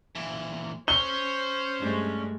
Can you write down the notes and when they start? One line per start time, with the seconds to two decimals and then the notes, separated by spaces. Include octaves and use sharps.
0.15 A#2 E3
0.88 C#4 C5 C#5 G7
1.79 G2 G#3 A3